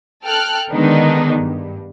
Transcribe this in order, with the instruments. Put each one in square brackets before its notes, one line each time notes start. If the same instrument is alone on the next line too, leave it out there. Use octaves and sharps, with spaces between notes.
[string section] A4 G5 F6 F#6
D3 D#3 G#3 B3 D4 D#4
G2